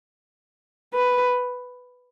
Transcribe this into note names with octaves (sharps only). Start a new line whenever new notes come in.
B4